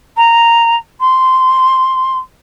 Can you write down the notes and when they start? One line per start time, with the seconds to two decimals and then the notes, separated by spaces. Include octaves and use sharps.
0.17 A#5
1.00 C6